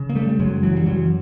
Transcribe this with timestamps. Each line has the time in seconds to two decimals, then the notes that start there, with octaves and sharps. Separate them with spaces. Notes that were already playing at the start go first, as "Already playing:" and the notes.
Already playing: C#3
0.09 A#3
0.15 G3 A3
0.29 G3
0.39 F#2 F#3 G#3
0.63 E3 F#3
0.77 G3
0.86 F#2 E3 F#3